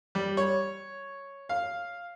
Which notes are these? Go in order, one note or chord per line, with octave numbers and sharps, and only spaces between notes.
G3
C#5
F5